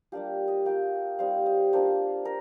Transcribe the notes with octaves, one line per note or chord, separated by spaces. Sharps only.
G3 A#3 D4 F4 G4
D#5
A#3 F4 G5
G3 C4 D#4 F5
D#5
A#3 D4 F4 C5
A#4